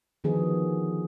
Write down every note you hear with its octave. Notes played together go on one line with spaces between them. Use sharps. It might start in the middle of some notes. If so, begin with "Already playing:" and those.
D3 D#3 F3 B3 F#4 G#4